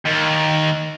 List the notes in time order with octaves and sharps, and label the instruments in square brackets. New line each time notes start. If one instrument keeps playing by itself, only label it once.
[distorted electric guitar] D#2